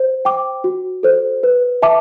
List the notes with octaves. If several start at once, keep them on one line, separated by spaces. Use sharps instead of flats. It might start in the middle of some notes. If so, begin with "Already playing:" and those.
Already playing: C5
G5 D6
F#4
A4 C5
B4
E5 A5 D6